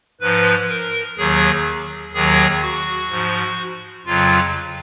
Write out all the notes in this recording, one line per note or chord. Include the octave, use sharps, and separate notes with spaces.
G#2 F3 B4
A#4
D#2 D#3 F#3 G#4
D#2 D#3 F#3 G#4
F#4
G#2 F3
F2 C#3 F#3 F4